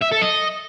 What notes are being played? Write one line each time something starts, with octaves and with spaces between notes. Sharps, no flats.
E5
A4
D#5